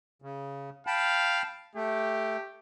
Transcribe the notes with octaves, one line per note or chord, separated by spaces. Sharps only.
C#3
F5 G5 A5 B5
A3 G4